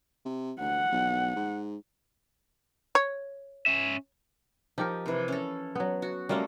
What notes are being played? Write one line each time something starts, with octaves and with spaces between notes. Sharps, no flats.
C3
D2 F#5
B1
G#2
C#5
C#4 E5
F3 D#4 G4 A#4
C3 E3
C#4 A4
F#3 B3
F#4
F#3 G3 A3 A#3 C#4 F4